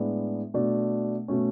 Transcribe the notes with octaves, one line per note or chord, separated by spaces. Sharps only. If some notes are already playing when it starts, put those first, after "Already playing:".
Already playing: A2 G#3 B3 D4
B2 A3 D4
B2 A3 C#4